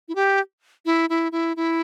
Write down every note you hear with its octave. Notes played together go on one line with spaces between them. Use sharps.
E4
G4
E4
E4
E4
E4